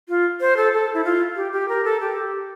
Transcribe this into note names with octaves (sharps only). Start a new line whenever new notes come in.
F4
C5
A4
A4
E4
F4
G4
G4
A#4
A4
G4